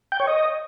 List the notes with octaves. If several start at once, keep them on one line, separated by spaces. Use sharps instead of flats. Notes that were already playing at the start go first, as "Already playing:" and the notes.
G5
C#5
D#5